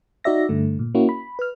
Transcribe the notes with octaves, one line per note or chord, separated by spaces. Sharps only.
D#4 F#4 D5 E5 A#6
G2 D3 A3
A#2
A#3 C#4 E4 F#4
B5
B4 F6